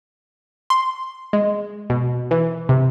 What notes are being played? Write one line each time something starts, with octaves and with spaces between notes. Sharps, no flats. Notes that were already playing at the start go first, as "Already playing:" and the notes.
C6
G#3
B2
E3
C3